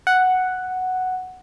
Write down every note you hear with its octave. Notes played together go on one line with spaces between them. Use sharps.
F#5